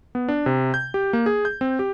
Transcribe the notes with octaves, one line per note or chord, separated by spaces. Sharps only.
B3
D4
C3
G6
G4
A#3
G#4
G6
C4
G4